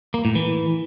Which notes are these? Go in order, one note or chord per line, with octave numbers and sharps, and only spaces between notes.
A#3
A2
E3